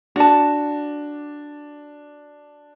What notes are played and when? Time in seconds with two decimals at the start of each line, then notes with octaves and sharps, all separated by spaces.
0.16 D4 F#4 A5